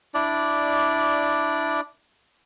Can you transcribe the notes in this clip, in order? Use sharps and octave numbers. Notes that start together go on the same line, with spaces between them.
D4 E4 D5